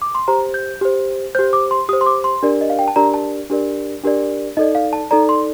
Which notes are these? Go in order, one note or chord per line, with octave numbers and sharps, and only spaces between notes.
D6
C6
G4 C5 A#5
G6
G4 C5
G4 C5 G6
D6
C6
G4 C5 D#6
C6
D6
C6
D4 G4 A#4 D5
D#5
F5
G5
A5
D4 G4 A#4 D5 A#5
A5
D4 G4 A#4 D5
D4 G4 A#4 D5
D#4 A4 D5 D#5
F5
A5
D#4 A4 D5 A#5
C6